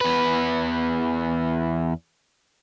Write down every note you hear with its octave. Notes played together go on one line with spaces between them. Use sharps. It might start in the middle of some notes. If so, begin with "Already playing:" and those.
E2 B4